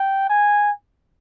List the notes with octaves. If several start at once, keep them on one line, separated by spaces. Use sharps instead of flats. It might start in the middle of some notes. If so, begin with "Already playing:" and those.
Already playing: G5
G#5